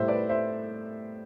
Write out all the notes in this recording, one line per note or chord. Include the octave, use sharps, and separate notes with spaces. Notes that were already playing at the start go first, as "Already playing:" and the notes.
Already playing: A2 G3 C5 E5
B4 D5
C5 E5